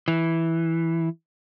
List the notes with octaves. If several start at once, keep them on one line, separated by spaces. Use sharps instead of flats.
E3